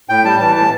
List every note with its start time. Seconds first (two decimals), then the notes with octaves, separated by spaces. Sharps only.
0.09 A2 G5
0.24 G3 A5
0.39 E3 A5
0.55 A2 A5